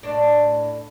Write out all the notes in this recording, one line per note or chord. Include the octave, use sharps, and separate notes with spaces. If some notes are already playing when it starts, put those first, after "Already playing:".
A2 D4